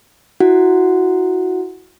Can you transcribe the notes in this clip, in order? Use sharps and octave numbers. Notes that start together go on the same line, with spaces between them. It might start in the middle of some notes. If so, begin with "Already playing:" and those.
E4 F#4 F#5